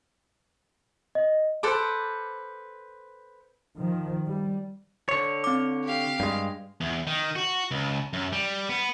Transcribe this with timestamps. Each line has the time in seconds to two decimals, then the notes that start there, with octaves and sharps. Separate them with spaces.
1.15 D#5
1.63 A4 B4 C5 D6
3.78 D#3 F3
4.25 G3
5.09 D3 C#5
5.44 C4 D6
5.83 G4 F5
6.20 G2 G#3
6.81 E2
7.07 D#3
7.36 F#4
7.71 C#2
8.13 F#2
8.32 G3
8.69 B3